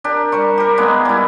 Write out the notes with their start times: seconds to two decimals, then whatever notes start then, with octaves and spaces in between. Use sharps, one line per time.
0.04 D4 G4 A#4
0.32 G3 C5 C#6
0.58 G4 A#4
0.77 G#3 A#3 B3 D#4
1.05 G3 E4